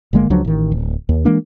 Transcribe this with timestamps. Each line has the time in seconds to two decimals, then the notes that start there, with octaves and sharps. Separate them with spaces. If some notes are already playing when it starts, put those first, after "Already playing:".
0.13 G1 D3 G#3 A#3
0.30 C#2 F3 F#3 D4
0.45 A1 D#3
0.72 D1
1.09 D#2
1.25 E3 G#3 A#3 D4